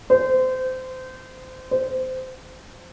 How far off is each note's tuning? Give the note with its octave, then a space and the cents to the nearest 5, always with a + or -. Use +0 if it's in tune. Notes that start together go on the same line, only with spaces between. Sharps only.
C5 -25
C5 -20